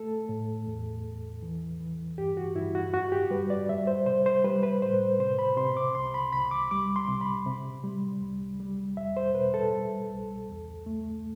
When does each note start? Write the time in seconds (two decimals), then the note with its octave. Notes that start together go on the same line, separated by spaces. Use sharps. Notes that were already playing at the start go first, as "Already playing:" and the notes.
Already playing: A3 A4
0.29 A2
0.67 E2
1.05 E2
1.42 E3
1.80 E3
2.18 G2 G4
2.37 F#4
2.56 G2 E4
2.75 F#4
2.93 F#2 F#4
3.12 G4
3.31 G3 B4
3.50 D5
3.69 G3 E5
3.87 C5
4.06 C3 C5
4.26 C5
4.44 G3 B4
4.63 B4
4.82 A2 C5
5.20 C3 C5
5.39 B5
5.57 C3 C6
5.77 D6
5.95 C2 C6
6.14 B5
6.32 C2 B5
6.51 D6
6.71 G3 D6
6.96 C6
7.08 C3
7.21 B5
7.46 C3
7.84 G3
8.21 C2
8.60 G3
8.97 E2 E5
9.17 C5
9.34 B2 B4
9.54 A4
9.72 G3
10.10 C2
10.49 E2
10.86 A3